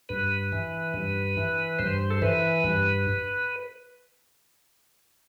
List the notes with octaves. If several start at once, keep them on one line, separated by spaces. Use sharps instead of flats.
G2 B4
E3
G2
E3
G2 C5
A4
E3 B4
G2